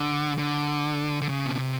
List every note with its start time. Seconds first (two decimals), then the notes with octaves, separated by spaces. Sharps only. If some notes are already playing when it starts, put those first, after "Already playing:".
Already playing: D3
0.38 D3
1.22 D3
1.29 C#3
1.46 B2
1.58 C3